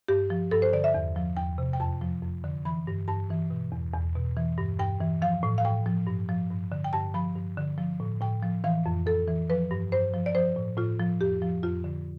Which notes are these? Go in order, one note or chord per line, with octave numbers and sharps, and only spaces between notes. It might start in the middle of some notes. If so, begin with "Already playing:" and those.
G2 G4
F3
G2 A4
C5
D3 D5
E5
E2
F3
E2 G5
C3
G5
F2 A5
F3
F2
D3
E3 B5
G2
G2 A5
E3
B2
E2
E2
B2
E3
G2
G2 G5
E3
F3 F5
A2
F5
A2 G5
F3
G2
F3
G2
D3
G5
G2 A5
F3 B5
G2
D3
F3
A2
A2 G5
F3
E3 F5
F2
F2 A4
E3
F3 B4
G2
G2 C5
F3
D5
F3 C5
A2
A2 F4
F3
F2 G4
F3
F2 F4
D3